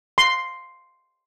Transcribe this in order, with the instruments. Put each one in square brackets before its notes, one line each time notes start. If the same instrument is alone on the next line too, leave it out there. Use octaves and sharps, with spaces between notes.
[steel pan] C6